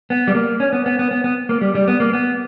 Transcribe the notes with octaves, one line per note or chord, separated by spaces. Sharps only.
B3
G3
A#3
C#4
B3
B3
B3
B3
B3
A#3
G3
G3
B3
A#3
B3